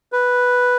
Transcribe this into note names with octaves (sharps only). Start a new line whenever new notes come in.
B4